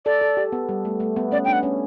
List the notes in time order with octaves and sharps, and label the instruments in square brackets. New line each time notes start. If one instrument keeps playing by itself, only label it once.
[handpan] A4 [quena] D5
[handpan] A4
G4
B3
G3
A3
A3
B3
[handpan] C#4 [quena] D5
[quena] G5
[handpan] D4
[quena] F#5
[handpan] C#4